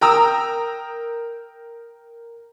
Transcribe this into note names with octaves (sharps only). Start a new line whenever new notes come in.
A#4 G5 A#5 D#6 E6